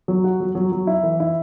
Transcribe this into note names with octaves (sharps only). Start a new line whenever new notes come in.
F#3
F#4
F#3
F#3
F#3
E4
E3
E4